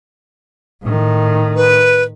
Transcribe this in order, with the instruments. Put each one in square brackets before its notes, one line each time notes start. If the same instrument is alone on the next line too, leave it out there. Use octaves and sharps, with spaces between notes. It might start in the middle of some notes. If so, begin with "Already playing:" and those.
[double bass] A2 D#3
[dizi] B4